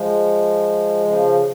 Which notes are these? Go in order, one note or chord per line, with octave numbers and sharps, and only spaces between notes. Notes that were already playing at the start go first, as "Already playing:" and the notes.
Already playing: F3 G#3
C#3 F3